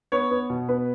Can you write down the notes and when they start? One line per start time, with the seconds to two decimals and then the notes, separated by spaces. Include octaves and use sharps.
0.12 B3 C#5
0.31 B3
0.50 B2
0.69 B3 B4